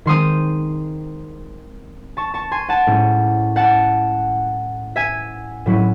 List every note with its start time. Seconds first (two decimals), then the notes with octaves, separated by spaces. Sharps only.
0.06 D#3 G#3 C4 C6 D#6
2.17 A5 C#6
2.34 A5 C#6
2.51 G#5 C6
2.69 F#5 A5
2.87 A2 G#3 C#4
3.56 F#5 A5
4.96 E5 G#5
5.66 A2 F#3 C#4 E4